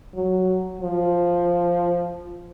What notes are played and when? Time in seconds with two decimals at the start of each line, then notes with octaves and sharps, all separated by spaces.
0.15 F#3
0.81 F3